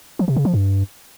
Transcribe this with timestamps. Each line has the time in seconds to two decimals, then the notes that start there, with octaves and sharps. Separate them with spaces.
0.19 F3
0.28 C3
0.36 C#3
0.45 F3
0.54 G2